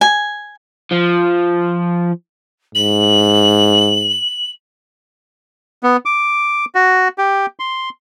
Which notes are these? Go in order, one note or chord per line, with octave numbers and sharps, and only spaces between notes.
G#5
F3
G#2 F#7
B3
D6
F#4
G4
C6